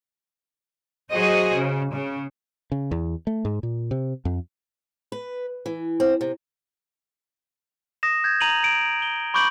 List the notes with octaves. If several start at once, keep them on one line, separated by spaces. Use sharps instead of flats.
F#3 F#4 G#4 C5 D#5
C#3
C#3
C#3
E2
A3
G#2
A#2
C3
F2
B4
E3
C4
C3
D#6 A#6 E7
G6 G#6
A#5 D#7 F7 F#7
D7
G7
B5 C#6 D6 G6 D7 F#7